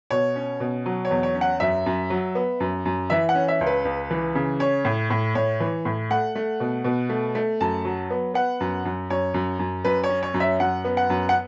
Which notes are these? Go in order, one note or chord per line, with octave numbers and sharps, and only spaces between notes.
B2 C#5
C#4
B2
F#3
C#5
E2
C#5
C#4
F#5
F#2 E5
F#2
F#3
B3
F#2
F#2
E3 E5
F#5
C#4
E5
C#2
B4
C#2
E3
C#3
C#4 C#5
A2
A2
A2 C#5
E3
A2
A3 F#5
A3
B2
B2
A3
A3
F#2 A5
F#3
B3
B3 F#5
F#2
F#2
F#2 C#5
F#2
F#2
F#2 B4
C#5
C#4
C#5
F#2
E5
F#2 F#5
B3
F#5
F#2
F#5